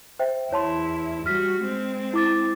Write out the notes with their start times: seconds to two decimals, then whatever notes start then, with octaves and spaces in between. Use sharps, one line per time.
0.19 C5 E5 G5
0.52 E2 E4 C#5 A5 C6
1.26 G3 F#4 F6 B6
1.62 G#3 C4
2.13 E4 D6 A6